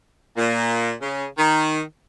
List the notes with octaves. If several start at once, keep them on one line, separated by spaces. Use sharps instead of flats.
A#2
C#3
D#3